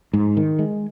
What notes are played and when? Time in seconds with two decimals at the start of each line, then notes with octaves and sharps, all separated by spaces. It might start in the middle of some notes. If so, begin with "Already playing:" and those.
0.13 G#2
0.37 D#3
0.59 G#3